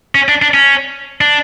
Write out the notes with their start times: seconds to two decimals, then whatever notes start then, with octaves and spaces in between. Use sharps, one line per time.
0.15 C#4
0.28 D4
0.42 D4
0.54 C#4
1.21 D4